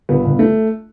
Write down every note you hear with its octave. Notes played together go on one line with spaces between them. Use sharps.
G1 B3
G1
A3